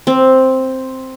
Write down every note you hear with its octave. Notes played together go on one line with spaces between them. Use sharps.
C4